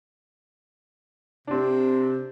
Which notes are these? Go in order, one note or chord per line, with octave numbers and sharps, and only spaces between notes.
C3 C4 D4